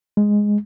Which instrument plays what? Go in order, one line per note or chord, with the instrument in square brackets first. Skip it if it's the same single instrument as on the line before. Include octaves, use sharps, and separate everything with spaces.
[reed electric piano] G#3